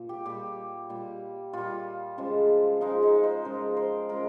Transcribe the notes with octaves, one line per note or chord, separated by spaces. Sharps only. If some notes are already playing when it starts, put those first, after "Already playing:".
Already playing: A#2
G4
A#2 G3 G4
A#2 G3
A#2 G3 F4
C#3 F3 G#3
C#3 F3 G#3 D#4
D#4
C5
C#3 F3 G#3 A#4
C5
C#3 F3 G#3 A#4